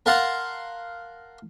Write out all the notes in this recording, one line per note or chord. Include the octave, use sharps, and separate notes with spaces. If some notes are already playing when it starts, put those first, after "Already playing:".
A#4 F5 F#5 A5 A#5 C6